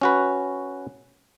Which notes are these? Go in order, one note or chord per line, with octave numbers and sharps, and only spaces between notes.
C#4 F#4 B4